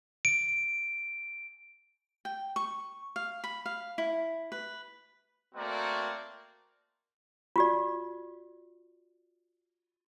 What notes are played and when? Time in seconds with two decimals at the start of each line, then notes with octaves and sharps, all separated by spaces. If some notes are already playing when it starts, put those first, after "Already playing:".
0.25 D7
2.25 G5
2.56 C#6
3.16 F5
3.44 B5
3.66 F5
3.98 E4
4.52 B4
5.55 A3 A#3 C4 F#4 A#4 D5
7.56 F4 F#4 D5